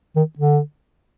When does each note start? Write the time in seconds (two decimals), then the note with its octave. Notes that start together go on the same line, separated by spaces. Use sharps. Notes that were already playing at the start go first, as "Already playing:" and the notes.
0.16 D#3
0.39 D3